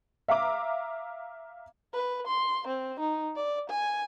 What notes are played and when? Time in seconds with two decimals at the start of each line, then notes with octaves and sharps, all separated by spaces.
0.28 E5 F5 A#5 D6
1.93 B4
2.27 C6
2.67 C4
3.00 D#4
3.36 D5
3.69 G#5